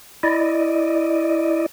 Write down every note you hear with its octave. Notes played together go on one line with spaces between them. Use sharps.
E4 D5 D#5